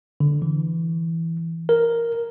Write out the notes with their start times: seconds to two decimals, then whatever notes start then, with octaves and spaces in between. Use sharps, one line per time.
0.20 D3
0.42 E3
1.69 A#4